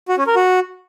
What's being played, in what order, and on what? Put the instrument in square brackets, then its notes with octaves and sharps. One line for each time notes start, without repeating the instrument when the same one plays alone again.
[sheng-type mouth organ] F#4
C#4
A#4
F#4